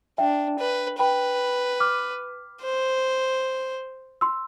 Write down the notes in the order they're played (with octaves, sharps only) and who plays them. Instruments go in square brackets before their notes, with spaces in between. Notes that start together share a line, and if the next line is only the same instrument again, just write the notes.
[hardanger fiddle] D4 [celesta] E5 G5
[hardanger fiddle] B4
[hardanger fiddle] B4 [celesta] G5 B5
[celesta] D6 F6
[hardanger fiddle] C5
[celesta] C6 E6